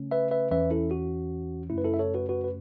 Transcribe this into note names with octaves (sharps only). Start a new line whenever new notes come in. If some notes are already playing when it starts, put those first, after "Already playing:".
Already playing: C#3 A3 C#4
B4 E5
B4 E5
E2 E3 C#4 B4 E5
E4 A4
F#4
F#2 C#3 A3 C#4 E4
B4
E4 A4
E5
A4 C#5
F#4 B4
F#4 B4
B4